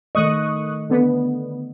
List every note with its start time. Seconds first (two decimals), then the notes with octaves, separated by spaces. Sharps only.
0.15 D#3 A3 D#5 C#6 D#6 F#6
0.89 D3 B3